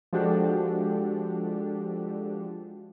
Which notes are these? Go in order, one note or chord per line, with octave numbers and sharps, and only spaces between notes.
F3 G#3 D4 F#4 G4 A4